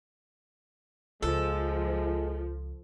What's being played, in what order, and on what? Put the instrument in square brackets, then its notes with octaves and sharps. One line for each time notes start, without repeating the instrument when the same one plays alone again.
[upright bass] C#2 [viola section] F3 [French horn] G#3 [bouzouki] A4